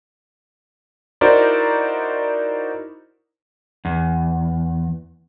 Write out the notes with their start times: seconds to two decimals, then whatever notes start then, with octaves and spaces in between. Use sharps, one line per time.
1.21 D#4 E4 F#4 A#4 C5 D5
3.85 E2